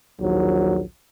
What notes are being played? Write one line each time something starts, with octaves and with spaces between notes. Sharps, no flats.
A#1 D#2 F#3